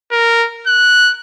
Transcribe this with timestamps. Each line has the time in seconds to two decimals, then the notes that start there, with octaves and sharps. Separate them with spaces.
0.12 A#4
0.67 F#6